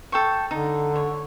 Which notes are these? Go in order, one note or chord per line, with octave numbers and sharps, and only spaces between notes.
A4 G5 C#6
D3 D#4
C#5